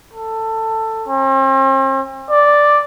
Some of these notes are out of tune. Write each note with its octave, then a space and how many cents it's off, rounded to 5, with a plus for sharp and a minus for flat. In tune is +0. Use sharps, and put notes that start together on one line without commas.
A4 +15
C4 +45
D5 +0